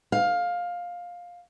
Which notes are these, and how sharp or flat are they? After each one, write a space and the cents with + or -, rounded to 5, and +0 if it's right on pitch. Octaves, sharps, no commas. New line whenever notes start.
F5 +15